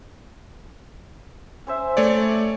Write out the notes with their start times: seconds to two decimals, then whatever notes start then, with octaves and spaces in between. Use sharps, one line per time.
1.67 C#4 C5 E5
1.97 A3 C#5 D5